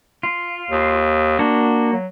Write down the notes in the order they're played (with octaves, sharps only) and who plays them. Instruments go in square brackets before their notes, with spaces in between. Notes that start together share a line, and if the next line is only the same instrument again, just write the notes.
[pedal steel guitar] F4
[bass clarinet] D#2
[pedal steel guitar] A#3 F#4 [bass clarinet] D4
[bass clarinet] F#3